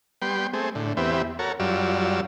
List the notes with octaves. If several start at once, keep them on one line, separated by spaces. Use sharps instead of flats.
G3 B3 G5 C6
A3 C4 G#4
A2 D3
E2 B3 C4 G4 E5
F#4 A4 A#4 C#5
F#2 F#3 G3 F4 D5 E6